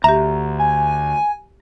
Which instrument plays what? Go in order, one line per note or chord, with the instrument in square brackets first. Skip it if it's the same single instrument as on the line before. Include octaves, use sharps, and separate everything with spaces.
[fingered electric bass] D2 [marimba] G4 E5 [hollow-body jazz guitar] A#5
[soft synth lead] G#5